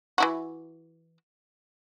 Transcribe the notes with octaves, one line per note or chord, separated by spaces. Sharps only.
E3 E4 F#4